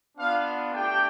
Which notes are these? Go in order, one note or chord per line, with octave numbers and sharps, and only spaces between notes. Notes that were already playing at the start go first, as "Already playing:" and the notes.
B3 D4 F4 F5
A3 D4 G4 G5